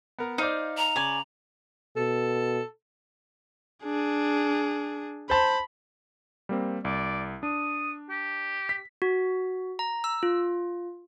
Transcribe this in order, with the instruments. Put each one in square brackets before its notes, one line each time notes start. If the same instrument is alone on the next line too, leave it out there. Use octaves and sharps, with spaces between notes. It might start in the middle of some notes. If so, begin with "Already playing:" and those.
[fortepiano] B3 A#4
[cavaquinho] D#4 F5 [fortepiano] C5 D5
[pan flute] A#5
[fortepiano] C#3 [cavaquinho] D5 G#5
[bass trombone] B2 [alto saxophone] A4
[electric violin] D4 G#4
[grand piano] C5 A5 [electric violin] B5
[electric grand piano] G3 A#3 C4
[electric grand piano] C2 [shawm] D5
[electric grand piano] D4 [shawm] D#6
[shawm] G4
[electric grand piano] B6
[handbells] F#4
A#5
E6
F4